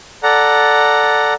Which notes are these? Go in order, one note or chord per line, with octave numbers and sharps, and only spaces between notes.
A4 D5 F#5 A#5